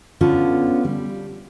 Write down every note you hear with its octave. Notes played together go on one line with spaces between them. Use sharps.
D3 B3 C#4 F4 A4
G3